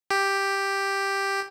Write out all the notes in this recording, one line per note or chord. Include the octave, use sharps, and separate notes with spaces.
G4